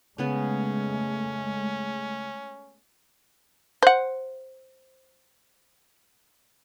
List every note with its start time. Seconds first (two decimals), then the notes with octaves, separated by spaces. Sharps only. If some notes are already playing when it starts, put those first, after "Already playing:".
0.18 C#3 G#3 A3 B3 C#4 B4
3.83 C5 F#5